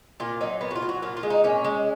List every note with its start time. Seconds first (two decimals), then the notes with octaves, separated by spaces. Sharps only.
0.20 A#2 F4
0.41 F#3 D#4
0.61 A#2 B3
0.71 F#4
0.76 F4
0.82 F#3
0.89 F#4
1.02 A#2 F4
1.17 F4
1.23 G#3
1.30 D#4
1.44 A#2 C#4
1.64 G#3